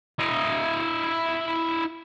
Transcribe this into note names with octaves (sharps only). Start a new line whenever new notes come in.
E4 D#5